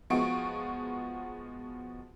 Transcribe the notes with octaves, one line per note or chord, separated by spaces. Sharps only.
F3 G#3 B3 F#4 C#6 D7